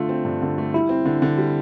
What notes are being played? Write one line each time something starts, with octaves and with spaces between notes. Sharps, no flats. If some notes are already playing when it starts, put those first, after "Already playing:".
Already playing: D3 A3 F4
C4
G2
D3
A3
G3 E4
C4
D3
D3
G3